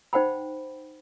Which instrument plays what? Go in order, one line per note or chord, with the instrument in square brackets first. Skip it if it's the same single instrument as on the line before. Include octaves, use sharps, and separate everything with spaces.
[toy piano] D#4 C5 F#5 G5 B5